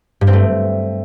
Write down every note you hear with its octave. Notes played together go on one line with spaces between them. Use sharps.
G2
C4
A3